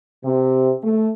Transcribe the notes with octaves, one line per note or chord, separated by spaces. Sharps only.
C3
A3